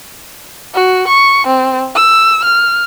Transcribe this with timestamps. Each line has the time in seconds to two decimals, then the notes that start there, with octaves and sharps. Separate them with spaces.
0.74 F#4
1.08 C#6
1.47 C4
1.95 E6
2.44 F6